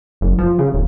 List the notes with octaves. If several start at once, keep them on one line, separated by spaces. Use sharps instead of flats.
F#1
F3
C#3
D1